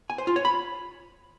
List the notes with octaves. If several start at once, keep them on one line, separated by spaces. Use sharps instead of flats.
G#5
C5
F4
C#5
B5